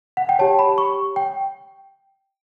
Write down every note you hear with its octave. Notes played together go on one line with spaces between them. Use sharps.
F#5
G5
G4 C#5 A5
B5
C#6
G5